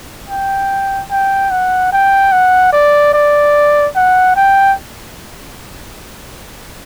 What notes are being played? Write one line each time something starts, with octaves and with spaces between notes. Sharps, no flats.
G5
G5
F#5
G5
F#5
D5
D5
F#5
G5